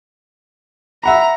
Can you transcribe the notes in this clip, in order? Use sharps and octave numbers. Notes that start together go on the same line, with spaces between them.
E5 F#5 A#5 B5